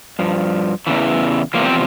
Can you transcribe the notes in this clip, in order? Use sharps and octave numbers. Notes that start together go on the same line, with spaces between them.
G2 F3
E2 C#3 E3
E2 C3 F3 A#3
C4